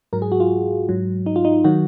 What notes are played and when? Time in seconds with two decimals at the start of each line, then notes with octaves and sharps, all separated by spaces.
0.13 G#2 F#3 A#4
0.22 G#4
0.32 F#4
0.40 F4
0.89 G#2 F#3
1.26 D#4
1.36 F4
1.45 D#4
1.64 D#3 F#3 F#4